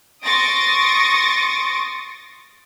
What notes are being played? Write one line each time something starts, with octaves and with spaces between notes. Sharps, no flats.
C6 C#6 D#6 A6 A#6 D7